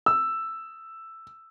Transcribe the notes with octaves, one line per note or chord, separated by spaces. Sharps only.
E6